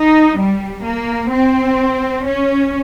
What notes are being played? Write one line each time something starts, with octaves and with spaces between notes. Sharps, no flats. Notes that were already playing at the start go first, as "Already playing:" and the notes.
Already playing: D#4
G3
A#3
C4
C#4